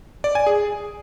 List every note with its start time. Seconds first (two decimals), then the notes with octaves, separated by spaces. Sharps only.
0.24 D5
0.35 G#5
0.47 G#4